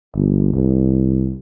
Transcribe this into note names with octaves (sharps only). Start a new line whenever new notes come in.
G1
C2